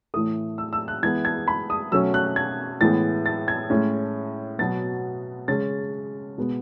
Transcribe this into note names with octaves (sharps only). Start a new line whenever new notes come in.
A2 E3 A3 D#6
E6
E6
F#6
E3 G#3 B3 G#6
G#6
B5
D#6
B2 F#3 A3 C#4 E6
F#6
G#6
A2 E3 G#3 B3 A6
A6
G#6
A2 G#3 C#4
B2 F#3 B3 A6
C#3 G#3 C#4 A6
B2 G#3 B3